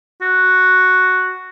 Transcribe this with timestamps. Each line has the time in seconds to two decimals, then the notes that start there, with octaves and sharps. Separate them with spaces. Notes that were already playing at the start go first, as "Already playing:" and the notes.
0.22 F#4